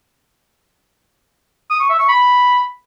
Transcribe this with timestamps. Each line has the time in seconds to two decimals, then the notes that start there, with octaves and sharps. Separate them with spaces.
1.70 D#6
1.80 C#6
1.89 E5
1.99 C#6
2.09 B5